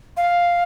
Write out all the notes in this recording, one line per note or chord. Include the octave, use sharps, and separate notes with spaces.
F5